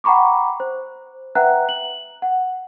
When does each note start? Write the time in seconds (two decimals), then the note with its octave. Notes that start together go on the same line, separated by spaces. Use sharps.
0.04 F#5 G5 A#5 B5 C#6 D6
0.60 C5
1.35 B4 E5 F#5 G5 A#5 F#6
1.69 F#7
2.22 F#5